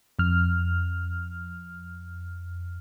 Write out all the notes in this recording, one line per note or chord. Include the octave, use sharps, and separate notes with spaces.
F2 F6